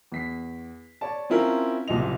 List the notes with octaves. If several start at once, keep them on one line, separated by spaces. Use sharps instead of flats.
E2 B6 C7
C#5 D5 A5
C4 C#4 E4 F4 A#4
F#1 C2 A#2 D#5 F7